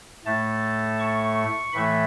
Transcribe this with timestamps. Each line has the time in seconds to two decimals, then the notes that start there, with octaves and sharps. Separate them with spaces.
0.25 A2 A3 A5
0.99 C#6
1.73 A2 E3 A3 B5